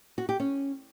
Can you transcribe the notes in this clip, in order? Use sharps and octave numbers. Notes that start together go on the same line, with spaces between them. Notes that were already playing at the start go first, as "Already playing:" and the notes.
F#4
G4
C#4